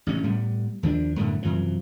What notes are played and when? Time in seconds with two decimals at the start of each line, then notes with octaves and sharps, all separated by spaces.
0.07 A1 C3 C#4
0.23 A2 G3 B3
0.83 D#2 F3 G3 D4
1.17 F#2 A2 D3 B3
1.43 F#2 C3 E3 F3